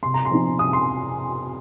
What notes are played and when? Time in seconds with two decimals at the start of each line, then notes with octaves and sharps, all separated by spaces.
0.03 C3 C6
0.14 A#5
0.25 C6
0.31 F3 C4 D#4
0.59 C3 D#6
0.73 C6